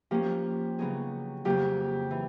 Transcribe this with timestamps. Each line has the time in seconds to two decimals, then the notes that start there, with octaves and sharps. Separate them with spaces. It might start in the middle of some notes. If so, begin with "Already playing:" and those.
0.11 F3 A#3 C#4 G4
0.79 C#3 F#3 B3 D#4 G#4
1.45 F2 C#3 F#3 A#3 G4
2.11 E3